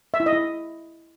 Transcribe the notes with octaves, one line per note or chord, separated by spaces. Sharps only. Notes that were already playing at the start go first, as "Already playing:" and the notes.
E5
E4
D#5
E4